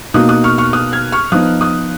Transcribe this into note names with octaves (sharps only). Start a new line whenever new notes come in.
B2 A#3 D#4 D#6 F#6
D#6 F#6
C#6 F6
C#6 F6
D#6 F#6
F6 G#6
C#6 F6
F3 B3 D#4 D#6 F#6
D#6 F#6